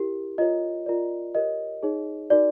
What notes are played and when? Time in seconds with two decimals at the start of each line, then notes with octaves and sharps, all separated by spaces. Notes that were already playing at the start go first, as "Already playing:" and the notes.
Already playing: E4 G4 A#4
0.38 F4 A#4 C#5 D#5
0.86 F4 A#4 D5
1.35 G4 A#4 C#5 D#5
1.83 D#4 G#4 C#5
2.30 D#4 F#4 A#4 D5